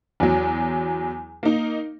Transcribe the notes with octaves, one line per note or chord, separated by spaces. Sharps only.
E2 F#3
A#3 D#4